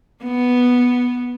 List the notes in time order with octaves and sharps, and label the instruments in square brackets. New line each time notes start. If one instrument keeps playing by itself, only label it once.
[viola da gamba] B3